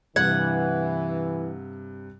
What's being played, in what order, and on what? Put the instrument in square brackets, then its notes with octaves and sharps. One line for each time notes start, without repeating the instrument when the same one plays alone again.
[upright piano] G2 C3 [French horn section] E3 [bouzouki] F#5 [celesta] G#6